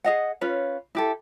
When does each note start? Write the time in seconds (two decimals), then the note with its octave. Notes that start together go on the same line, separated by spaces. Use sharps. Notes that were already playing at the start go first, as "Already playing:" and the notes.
0.04 G#4 D#5 F#5
0.41 C#4 F4 B4 C#5
0.95 E4 G4 A4